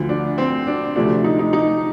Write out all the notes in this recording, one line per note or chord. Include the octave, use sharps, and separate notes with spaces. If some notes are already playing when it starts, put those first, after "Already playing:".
Already playing: D2 D3 F3
D4
C4
D4
D2 C3 F3 A3 D4
D#4
D#4
D#4